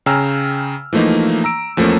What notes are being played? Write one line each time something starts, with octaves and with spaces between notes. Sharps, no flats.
C#3 G5 G#5 A#5 E6 F6
E3 F3 A3 A#3 D#4
A#5 E6 D7
E2 F3 A3 A#3 C#4